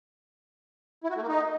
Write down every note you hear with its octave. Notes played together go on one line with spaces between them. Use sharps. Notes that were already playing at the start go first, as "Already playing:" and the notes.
E4
F#4
A3
A#3
D#4